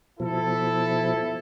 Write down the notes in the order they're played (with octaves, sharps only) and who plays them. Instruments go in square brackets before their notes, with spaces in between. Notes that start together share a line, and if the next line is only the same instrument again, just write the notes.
[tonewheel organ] B2 F3 [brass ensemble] E4 A4